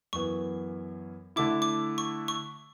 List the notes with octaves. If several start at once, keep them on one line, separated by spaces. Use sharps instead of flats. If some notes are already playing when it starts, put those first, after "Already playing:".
F#2 E3 B3 C#6
D3 A3 E4 D6
D6
C#6
C#6